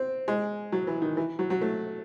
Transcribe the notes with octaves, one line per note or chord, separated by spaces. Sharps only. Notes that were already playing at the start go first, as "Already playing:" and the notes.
Already playing: C4
G#3
F#3
E3
D#3
E3
F#3
F#3
A3